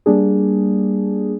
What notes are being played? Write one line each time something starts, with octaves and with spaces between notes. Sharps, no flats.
G3 A#3 D4 G#4